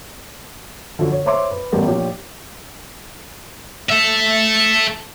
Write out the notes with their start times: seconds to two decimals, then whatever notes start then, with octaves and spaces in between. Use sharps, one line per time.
0.99 D3 F3 F#3 F#4
1.12 C#5
1.26 C5 C#5 E5 C6 D6
1.51 B4
1.72 A1 G2 B3 G4 A#4 D5
1.86 A#1 F4 G4 C#5
3.90 A4 E5